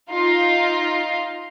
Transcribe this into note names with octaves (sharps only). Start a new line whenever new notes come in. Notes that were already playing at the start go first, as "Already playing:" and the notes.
D#4 F4